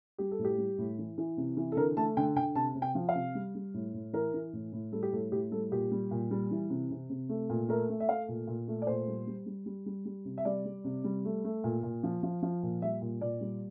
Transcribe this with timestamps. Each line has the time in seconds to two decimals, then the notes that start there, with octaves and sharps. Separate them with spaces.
0.18 G3 G4
0.31 A4
0.39 A2
0.45 G4
0.58 G3
0.78 A2
0.99 E3
1.18 E3
1.37 C3
1.57 E3
1.72 A4
1.77 D3 A#4
1.97 A3 A5
2.17 D3 G5
2.36 D3 G5
2.55 C3 A5
2.75 C3
2.82 G5
2.95 F3
3.09 F5
3.15 C3
3.35 G3
3.55 G3
3.74 A2
3.94 A2
4.13 E3 A#4
4.34 E3
4.53 A2
4.72 A2
4.92 G3 A4
5.03 G4
5.12 A2 A4
5.32 A2 G4
5.51 G3 A4
5.72 A#2 G4
5.91 G3
6.11 A#2
6.31 G3
6.51 E3
6.70 C3
6.91 C3
7.10 C3
7.29 A3
7.50 A#2
7.68 A3 A#4
7.89 A3
8.00 E5
8.09 A3 F5
8.28 A#2
8.47 A#2
8.68 A3
8.82 D5
8.87 A#2 C5
9.08 G3
9.27 G3
9.46 G3
9.66 G3
9.86 G3
10.05 G3
10.25 C3
10.38 E5
10.45 G3 D5
10.65 G3
10.84 C3
11.04 G3
11.25 A3
11.44 A3
11.64 A#2
11.83 A#2
12.03 F3
12.23 F3
12.43 F3
12.63 A#2
12.82 G3 E5
13.02 A#2
13.21 A#2 D5
13.41 G3